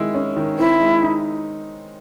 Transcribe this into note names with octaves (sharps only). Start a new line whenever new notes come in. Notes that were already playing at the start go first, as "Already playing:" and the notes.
Already playing: D#3 G#3 E4
C#4
D#3
C4 E4
G#3
D#4